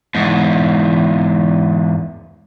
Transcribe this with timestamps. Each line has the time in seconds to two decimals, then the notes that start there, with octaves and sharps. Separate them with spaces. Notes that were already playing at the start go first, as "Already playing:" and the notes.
0.15 E2 G#2